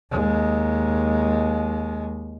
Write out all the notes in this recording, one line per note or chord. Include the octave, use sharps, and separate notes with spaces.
D#2 G#3